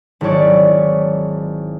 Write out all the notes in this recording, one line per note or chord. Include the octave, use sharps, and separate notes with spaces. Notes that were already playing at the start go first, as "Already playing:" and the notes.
G#1 F#3 E4 C#5 D5